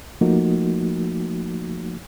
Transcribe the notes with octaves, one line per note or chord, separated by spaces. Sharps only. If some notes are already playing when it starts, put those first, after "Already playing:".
F3 A3 A#3 D#4 F#4